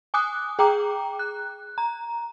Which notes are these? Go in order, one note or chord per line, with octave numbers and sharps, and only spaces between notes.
G#5 D6 D#6 F#6
G#4 G5 A#5 D6
F#6
A#5